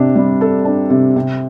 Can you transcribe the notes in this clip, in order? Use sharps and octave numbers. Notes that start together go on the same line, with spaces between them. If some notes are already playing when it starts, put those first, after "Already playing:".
Already playing: C3 D4
G3
A4
D4
C3
C3